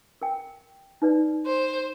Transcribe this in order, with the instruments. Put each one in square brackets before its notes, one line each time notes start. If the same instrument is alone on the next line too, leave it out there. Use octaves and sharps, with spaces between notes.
[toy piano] A#4 G5
D#4 B4 D5
[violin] C5